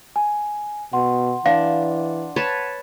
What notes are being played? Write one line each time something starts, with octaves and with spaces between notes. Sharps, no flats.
G#5
B2 F#5 C6
E3 D4 F5
B4 C#5 A5